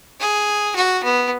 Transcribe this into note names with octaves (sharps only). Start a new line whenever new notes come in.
G#4
F#4
B3